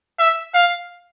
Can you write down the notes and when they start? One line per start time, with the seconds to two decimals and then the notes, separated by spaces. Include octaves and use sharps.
0.19 E5
0.54 F5